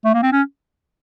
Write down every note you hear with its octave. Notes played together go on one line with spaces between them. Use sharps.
A3
A#3
C4
C#4